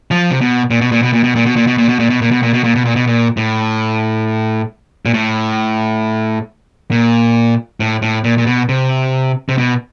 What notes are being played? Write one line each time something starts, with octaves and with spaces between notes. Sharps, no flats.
F3
C3
B2
A#2
B2
A#2
B2
A#2
B2
A#2
B2
A#2
B2
A#2
B2
A#2
B2
A#2
B2
A#2
B2
A#2
B2
A#2
B2
A#2
A2
A#2
A2
A#2
A2
A2
A#2
A#2
B2
C3
C3
B2